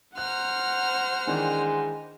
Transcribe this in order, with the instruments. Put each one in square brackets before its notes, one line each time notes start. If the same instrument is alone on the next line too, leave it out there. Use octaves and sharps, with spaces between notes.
[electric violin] C5 F#5 [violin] A#5 F6 [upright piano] F#6
[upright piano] D#3 E3 D4 [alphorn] G#3